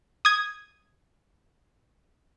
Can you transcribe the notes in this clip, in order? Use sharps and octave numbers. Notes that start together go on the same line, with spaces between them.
D#6 G#6